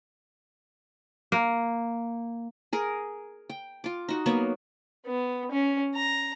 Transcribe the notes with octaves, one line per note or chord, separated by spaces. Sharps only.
A#3
G#4 A#4
G5
F4 D6
D#4 F#4
F#3 A#3 B3 C#5
B3
C#4
A#5